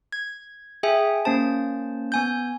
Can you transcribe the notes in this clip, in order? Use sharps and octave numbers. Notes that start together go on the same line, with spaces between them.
G#6
G#4 E5 G5 G#5
A#3 C#4 C5 A5
B3 G#5 G6